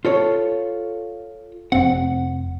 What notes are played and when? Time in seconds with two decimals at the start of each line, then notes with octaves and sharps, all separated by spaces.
0.05 F4 A4 C#5
1.72 F1 C4 F#5